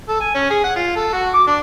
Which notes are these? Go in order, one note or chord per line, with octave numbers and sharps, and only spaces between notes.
A4
G#5
C#4
G#4
F#5
F4
A4
F#4
D6
D4